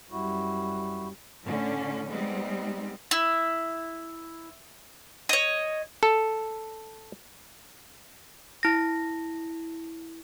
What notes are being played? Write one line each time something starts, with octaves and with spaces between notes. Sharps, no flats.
F#2 G3 E4 F#4
A2 D3 C#4
G3 G#3 B3 C4 D#4
E4
C#5 D#5
A4
E4 A#6